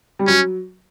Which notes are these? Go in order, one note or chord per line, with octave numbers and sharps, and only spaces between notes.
G3
F#3 C#4